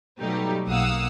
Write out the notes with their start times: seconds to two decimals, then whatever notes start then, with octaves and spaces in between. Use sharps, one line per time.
0.20 B2 F#3 G3 A3 D#4 G4
0.68 B1 A#3 F5 F#5 D#6 E6